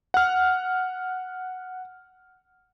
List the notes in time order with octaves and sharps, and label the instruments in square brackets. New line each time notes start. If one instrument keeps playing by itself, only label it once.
[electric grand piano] F#5 F6